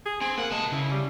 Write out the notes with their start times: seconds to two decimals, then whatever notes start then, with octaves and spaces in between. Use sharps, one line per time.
0.06 G#4
0.21 C4 G#5
0.38 A#3 F#5
0.51 C3 G#3 A5
0.72 C#3 E4
0.91 G3